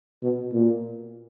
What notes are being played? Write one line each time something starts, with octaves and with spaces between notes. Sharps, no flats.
B2
A#2